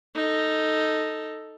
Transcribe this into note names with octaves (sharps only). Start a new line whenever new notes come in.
D#4 A4